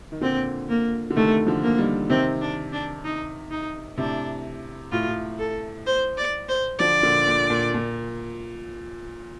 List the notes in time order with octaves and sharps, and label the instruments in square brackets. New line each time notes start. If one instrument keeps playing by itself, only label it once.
[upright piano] D#3
[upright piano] A#2 D3 [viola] C4
[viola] A#3
[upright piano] D3
[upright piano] C3 D#3 [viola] A3
[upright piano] D3 F3
[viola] A#3
[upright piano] D#3 G3
[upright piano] C3 D#3 [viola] C4
[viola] D4
D4
D#4
D#4
[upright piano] A2 C3 [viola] D4
[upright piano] A2 [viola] F4
[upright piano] A2
[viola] A4
C5
D5
C5
[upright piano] D3 F3 [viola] D5
[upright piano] A#2 D3
A#2
A#2
A#2